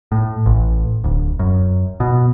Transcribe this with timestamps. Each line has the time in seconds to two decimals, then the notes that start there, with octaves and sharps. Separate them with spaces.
0.12 A2
0.46 A1
1.04 D1
1.39 F#2
2.00 B2